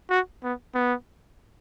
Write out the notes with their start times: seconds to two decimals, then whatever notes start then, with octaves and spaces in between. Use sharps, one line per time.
0.10 F#4
0.43 B3
0.75 B3